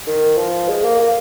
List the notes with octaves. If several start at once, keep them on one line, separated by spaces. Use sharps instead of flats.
D#3
F3
G#3
A#3
A#3